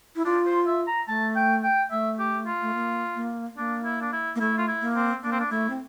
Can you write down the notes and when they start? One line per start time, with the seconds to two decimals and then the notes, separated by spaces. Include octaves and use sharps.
0.16 E4
0.25 D4 F4
0.46 C5
0.67 E5
0.87 A#5
1.07 A3 A5
1.36 G5
1.63 G5
1.91 A3 E5
2.19 G4
2.47 F4
2.62 A3
2.74 A#3
3.16 A#3
3.57 A#3 D4
3.85 E4
4.01 D4
4.12 E4
4.36 A#3
4.40 A3 E4
4.58 F4
4.68 E4
4.82 A#3
4.96 C4
5.24 A#3 D4
5.32 C4
5.40 D4
5.51 A3 E4
5.70 C4